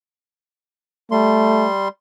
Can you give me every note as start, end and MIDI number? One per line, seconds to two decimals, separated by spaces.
1.11 1.88 55
1.11 1.69 57
1.11 1.88 84